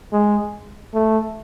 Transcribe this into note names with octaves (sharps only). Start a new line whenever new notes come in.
G#3
A3